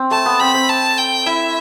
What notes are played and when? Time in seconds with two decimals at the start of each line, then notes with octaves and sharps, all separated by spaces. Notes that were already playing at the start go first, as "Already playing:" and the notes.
Already playing: C4
0.11 A3 A5
0.26 B3
0.40 C4 B5
0.54 C4
0.69 A5
0.98 G5
1.26 E4 E5